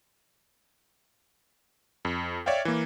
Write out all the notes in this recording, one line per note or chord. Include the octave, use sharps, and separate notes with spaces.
F2
C#5 D5 E5 F5 G5
E3 A#3